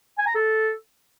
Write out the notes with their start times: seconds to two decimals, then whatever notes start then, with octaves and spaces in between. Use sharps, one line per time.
0.18 G#5
0.26 A#5
0.35 A4